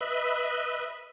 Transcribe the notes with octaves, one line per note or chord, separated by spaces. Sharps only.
B4 D#5 E5 B5